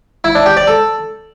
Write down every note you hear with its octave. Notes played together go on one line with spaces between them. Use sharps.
E4
D4
G4
D5
A4